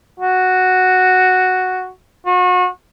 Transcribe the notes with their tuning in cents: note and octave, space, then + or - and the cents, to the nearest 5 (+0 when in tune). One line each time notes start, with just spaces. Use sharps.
F#4 +0
F#4 -35